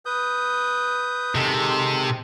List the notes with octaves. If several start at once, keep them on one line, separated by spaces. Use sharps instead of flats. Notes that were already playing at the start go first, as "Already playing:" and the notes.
B4 D#6 G6
C3 D#3 G#3 A4